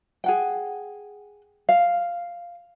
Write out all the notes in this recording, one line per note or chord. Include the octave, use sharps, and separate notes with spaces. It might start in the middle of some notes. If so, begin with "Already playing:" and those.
G#4 F#5 G5
F5